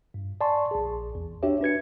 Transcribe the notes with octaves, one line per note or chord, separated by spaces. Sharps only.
G2
D5 G#5 A5 C6 C#6
A#1 G#4
E2
D4 F#4 G4 C#5 E5
D4 B4 G#6 C#7